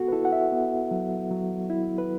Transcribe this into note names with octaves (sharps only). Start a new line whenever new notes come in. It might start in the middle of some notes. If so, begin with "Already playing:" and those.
Already playing: B3 F#4 A4
B4
E4 A4
F#5
E5
B3
F#3
F#3
E4
B4